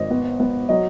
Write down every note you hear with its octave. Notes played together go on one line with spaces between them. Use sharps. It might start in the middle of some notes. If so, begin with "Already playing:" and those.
Already playing: G#1 D#5
B3
B3
F#3 D#5